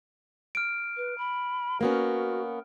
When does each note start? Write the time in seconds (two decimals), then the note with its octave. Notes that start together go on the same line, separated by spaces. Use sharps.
0.55 F6 D7
0.97 B4
1.18 B5
1.81 A#3 B3 C#4 F#4